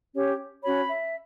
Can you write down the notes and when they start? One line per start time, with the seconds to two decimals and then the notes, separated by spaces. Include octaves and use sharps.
0.13 C#4 G4 C#5
0.64 C#4 F#4 C#5 B5
0.89 E5